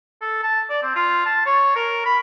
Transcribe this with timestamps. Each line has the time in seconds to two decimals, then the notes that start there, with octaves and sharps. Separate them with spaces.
0.22 A4
0.43 A5
0.70 D5
0.82 C4
0.96 F4
1.26 A5
1.46 C#5
1.76 A#4
2.06 B5